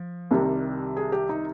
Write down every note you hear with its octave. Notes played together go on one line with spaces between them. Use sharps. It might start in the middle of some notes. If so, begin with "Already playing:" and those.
Already playing: F3
C2 C3 D#3 G3
G#4
G4
D#4